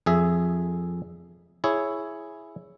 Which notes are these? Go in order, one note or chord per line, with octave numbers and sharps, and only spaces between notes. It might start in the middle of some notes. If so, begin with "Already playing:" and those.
F2 G#4 E5
E4 G#4 C#5